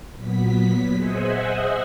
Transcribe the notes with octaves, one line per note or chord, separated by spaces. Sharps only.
A#2 F#3 B3 B6
G#4 C5 D#5 E5 F#5 G#5